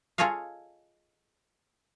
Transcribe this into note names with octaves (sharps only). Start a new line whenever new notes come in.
F4 G#4 A4 C#5 D#5 F5